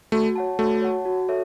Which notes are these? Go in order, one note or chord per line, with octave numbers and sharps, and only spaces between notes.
A3 F#4
C#5 F#5 A5
A3 F#4
C#5 F#5 A5
F#4
A4 C#5 E5